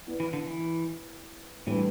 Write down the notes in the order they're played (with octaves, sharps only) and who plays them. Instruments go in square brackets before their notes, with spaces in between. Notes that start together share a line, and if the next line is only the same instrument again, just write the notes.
[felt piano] B3 E4 B4 D5
[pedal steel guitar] E3
D3
E3
[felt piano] A2 G3 D4 B4 [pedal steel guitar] E3